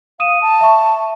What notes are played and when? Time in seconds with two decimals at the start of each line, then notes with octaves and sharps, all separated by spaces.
0.20 F5 D#6 D#7 E7
0.42 A5
0.61 E5 C#6